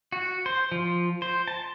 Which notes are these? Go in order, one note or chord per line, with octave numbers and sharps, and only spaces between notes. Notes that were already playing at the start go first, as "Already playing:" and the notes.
F#4
C5
F3
C5
A5